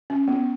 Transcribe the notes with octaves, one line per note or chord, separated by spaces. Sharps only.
C#4
B3